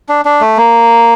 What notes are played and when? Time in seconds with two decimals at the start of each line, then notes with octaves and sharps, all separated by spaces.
0.09 D4
0.25 D4
0.41 A3
0.57 A#3